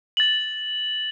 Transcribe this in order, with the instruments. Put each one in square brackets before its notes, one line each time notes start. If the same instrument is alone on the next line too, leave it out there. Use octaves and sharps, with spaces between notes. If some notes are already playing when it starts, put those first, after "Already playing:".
[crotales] A6 F#7